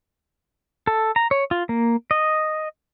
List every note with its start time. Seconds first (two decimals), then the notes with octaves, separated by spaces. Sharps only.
0.87 A4
1.16 A#5
1.31 C#5
1.51 F4
1.69 A#3
2.11 D#5